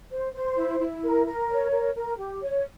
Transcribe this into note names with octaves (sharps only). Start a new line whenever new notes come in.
C5
C5
E4
E4
A#4
A#4
C#5
A#4
A#4
G4
C#5